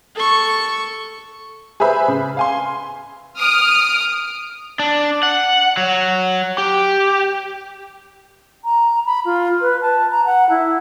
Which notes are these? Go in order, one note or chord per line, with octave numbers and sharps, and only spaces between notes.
A4 C#6
G#4 B4 C5 E5 B5
C#3
F5 G#5 C6
D#6 F6 D7
D4
F#5
F#3
G4
A#5
B5
F4
B4
A5
A#5
F#5
E4